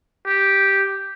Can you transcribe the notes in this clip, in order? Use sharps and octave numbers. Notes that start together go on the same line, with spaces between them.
G4